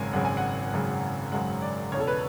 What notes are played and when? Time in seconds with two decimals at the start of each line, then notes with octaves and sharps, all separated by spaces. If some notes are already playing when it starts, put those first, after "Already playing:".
Already playing: G#1 F#2 C#3 G#3 G#5
0.13 G#1 F#2 C#3 G#3 F#5
0.25 G#5
0.37 F#5
0.72 G#1 F#2 C#3 G#3
1.32 G#1 F#2 C#3 G#3 F#5
1.62 D5
1.92 E1 E2 C#3 C#5
2.00 A4
2.07 B4